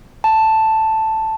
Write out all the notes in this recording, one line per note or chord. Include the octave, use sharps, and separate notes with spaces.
A5